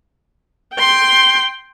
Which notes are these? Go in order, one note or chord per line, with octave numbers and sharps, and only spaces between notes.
G5 C6